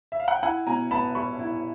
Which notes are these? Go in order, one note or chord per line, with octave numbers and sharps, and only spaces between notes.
E5
F5
F#5
G5
E4 F#5 G#5
B2 G#5 A#5
B3 A5 B5
G3 B5 C#6
E4